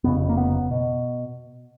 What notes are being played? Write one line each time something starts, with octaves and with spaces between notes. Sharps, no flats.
F1 F2 C#3 B3
A#3
B3
B2